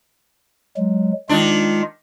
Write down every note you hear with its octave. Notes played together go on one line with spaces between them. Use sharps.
F#3 G#3
D#3 G#3 D4 F4